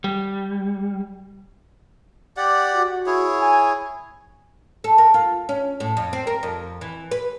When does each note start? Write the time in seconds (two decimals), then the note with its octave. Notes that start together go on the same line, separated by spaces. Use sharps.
0.04 G3
2.37 G4 D5 F#5
2.74 F#4
3.06 E4 G#4 C#5
3.42 G#5
4.84 A4
4.98 A#4
5.14 F4
5.49 C#4
5.80 A2
5.97 F2
6.13 C4
6.27 A#4
6.43 F2
6.81 E3
7.11 B4